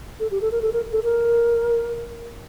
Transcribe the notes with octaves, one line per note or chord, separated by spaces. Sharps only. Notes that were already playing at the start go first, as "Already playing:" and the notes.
A4
G4
A4
A#4
A4
A#4
A4
A#4